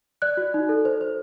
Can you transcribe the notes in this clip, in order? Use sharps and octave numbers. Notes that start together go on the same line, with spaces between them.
D5 F#6
F#4
D#4
A4
C5
C5